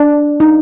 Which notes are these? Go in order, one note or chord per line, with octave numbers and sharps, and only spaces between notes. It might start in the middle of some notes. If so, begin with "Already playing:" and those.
Already playing: D4
D#4